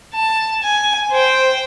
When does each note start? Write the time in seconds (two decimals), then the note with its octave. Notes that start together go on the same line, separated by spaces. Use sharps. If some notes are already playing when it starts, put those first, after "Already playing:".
0.14 A5
0.62 G#5
1.11 C5 G5